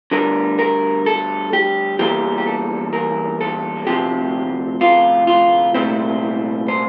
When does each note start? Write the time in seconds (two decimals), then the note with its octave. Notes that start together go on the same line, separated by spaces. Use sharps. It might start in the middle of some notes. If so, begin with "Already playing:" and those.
0.11 D2 D3 G3 A#4
0.59 A#4
1.06 A4
1.53 G4
1.99 E2 E3 G3 A#3 G4
2.38 G4
2.47 A4
2.93 A#4
3.41 A4
3.87 D2 C3 F3 C4 G4
4.81 F4
5.27 F4
5.74 C2 A#2 A3 C4 E4
6.68 C5